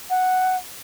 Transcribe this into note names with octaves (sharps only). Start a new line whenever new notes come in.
F#5